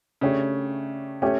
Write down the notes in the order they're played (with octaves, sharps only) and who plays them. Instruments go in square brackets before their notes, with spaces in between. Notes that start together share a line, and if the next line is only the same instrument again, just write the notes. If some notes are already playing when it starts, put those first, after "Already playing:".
[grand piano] C#3 [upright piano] A3 D4 G4 C#5
[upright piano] A3 C#4 G4 C#5